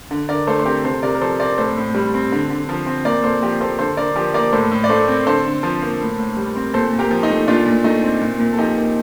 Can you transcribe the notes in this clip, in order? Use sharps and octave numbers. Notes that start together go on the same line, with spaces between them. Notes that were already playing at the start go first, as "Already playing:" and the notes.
D3
D3 A#4 D5
A3 A4 C5
C5
C4 G4 A#4
C3 A4 C5
C3 A#4 D5
A#4
F3 A4 C5
C4 A#4 D5
A2 A4 C5
A2
G3
C4
D3
D3
F3
C4
A#2 A#4 D5
A#2 A4 C5
F3 G4 A#4
A#3 A4 C5
D3 A4 C5
D3 A#4 D5
F3 G4 A#4
A#3 A#4 D5
A2 A4 C5
A2
D5
A3 A4 C5
C4
D3 A4 C5
D3
F3
A#3
A2
A2
G3
C4
A#2 A4 C5
A#2
G4 A#4
F3
D#4
A3
A#2 D4 F4
A#2
A3 D#4
C4
A#2
A#2
A4
F3 D#4 G4
A#3